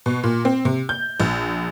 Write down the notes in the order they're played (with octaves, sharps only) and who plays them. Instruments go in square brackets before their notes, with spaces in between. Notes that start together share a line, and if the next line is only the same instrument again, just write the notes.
[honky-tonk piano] B2
A#2
C4
C3
G6
A#1